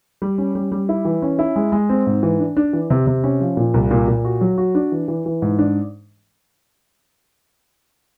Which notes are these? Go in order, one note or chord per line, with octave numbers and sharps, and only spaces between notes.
G3
C#4
G3
G3
E4
E3
C#4
E4
G#3
G#3
C4
G#2
E3
D4
D4
E3
C3
C3
C#4
F3
A#2
C2
A#2
A#2
F#4
F#3
F#4
D4
E3
E3
E3
G#2
D4